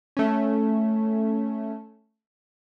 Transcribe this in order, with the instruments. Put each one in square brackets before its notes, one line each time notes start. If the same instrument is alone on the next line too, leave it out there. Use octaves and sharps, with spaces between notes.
[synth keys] A3 C#4